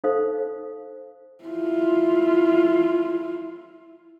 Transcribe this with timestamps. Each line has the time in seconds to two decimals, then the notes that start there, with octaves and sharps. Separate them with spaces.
0.04 D#4 A4 C5 F5
1.44 E4 F4